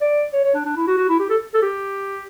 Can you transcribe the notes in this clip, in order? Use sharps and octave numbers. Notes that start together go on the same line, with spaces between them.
D5
C#5
C#5
D4
D4
E4
F#4
F#4
E4
G4
A4
A4
G4